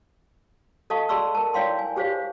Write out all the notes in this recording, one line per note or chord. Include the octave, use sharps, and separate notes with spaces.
A4 D#5 F5 A5 C#6
G#4 D5 A5 C6 C#6 E6
A#4 A5
E4 C#5 D5 F5 G5 C6
G#5
G4 G#4 C5 C#5 F5